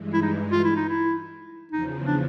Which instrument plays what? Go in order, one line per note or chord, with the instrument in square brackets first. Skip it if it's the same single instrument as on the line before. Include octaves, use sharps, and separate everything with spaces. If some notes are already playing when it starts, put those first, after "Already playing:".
Already playing: [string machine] G2 E3 G#3
[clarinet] E4
D#4
F4
E4
D#4
E4
[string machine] E2 C#3 F3 [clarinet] D#4
[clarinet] D4